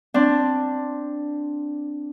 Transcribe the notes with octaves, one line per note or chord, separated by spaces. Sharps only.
C4 D4